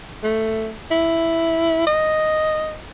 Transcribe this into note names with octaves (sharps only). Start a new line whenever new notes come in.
A3
E4
D#5